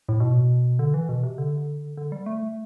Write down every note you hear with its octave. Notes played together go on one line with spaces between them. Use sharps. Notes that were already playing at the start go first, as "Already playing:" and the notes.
A2
B2
D3
E3
B2
C3
D3
D3
G3
A3